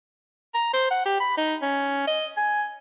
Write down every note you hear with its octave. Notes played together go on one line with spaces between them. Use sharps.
A#5
C5
F#5
G4
B5
D#4
C#4
D#5
G#5